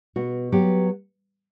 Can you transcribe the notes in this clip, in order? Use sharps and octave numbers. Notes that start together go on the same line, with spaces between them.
B2 F#4
F#3 B3 G4